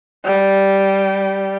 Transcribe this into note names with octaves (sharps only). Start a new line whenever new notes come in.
G3